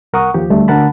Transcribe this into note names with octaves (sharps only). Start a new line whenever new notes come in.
C2 A#4 F#5 C#6 D#6
D#2 F3 G4
D2 G3 A3
D2 D3 A#4 F#5 A5 B5